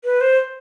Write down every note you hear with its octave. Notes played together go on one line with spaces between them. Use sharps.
B4
C5